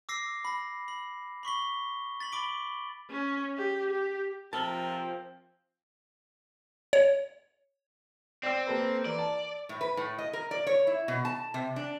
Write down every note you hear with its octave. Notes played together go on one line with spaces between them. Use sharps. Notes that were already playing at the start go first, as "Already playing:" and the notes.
D6 E6 A#6 C7
B5 A#6
B5
B5 C#6 B6 G7
A6 B6 F#7
B5 D6 D7 G7
C#4
G4
G4
C3 F3 C4 A4 A#4 A5
C#5
C4 D5 G5 E6
A#3 A4 B4
E3 A#4 D5
A5
A2
B4
A2
D#5
A#4
D5
C#5
E4
B2
A5
C3
D4